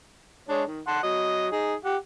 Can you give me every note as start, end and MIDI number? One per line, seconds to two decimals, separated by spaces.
0.49 0.63 56
0.49 0.63 62
0.49 0.63 73
0.67 0.81 51
0.87 0.99 78
0.87 0.99 81
0.87 0.99 84
1.03 1.47 54
1.03 1.47 75
1.52 1.74 63
1.52 1.74 68
1.85 1.96 67
1.85 1.96 78